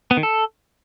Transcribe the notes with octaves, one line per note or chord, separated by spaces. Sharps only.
B3
D#3
A4